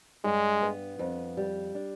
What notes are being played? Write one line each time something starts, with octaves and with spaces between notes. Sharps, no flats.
G2 G#3
B3
F2
G3
D4